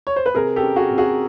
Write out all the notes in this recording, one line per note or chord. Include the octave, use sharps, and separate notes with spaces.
C#5
C5
B4
C3 G#4 A#4
G4 A4
C#4
F#4 G#4
C3
F#4 G#4